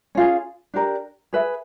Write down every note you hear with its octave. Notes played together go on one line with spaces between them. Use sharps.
C#4 F4 G#4
D4 G4 A#4 D5
G#4 B4 E5